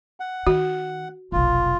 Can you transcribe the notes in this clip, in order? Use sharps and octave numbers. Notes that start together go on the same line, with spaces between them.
F#5
D#3 F#4
F1 B1 F4